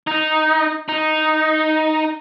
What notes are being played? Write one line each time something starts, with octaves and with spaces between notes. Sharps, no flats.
D#4
D#4